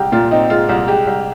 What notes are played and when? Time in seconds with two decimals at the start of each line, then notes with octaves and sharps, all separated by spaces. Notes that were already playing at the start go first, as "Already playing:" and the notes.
Already playing: C2 G#3 G4
0.12 A#2 F4
0.31 C4 D#4
0.50 G#3 F4
0.68 C2 F4
0.88 G#3 G4
1.07 C2